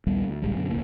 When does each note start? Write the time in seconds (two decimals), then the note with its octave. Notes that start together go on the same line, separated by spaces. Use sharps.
0.07 A#1 D#2 G3 B3
0.27 D2
0.42 D1 A#1 G3 G#3
0.56 F#2 B2 D3
0.70 E1 C#2 A#3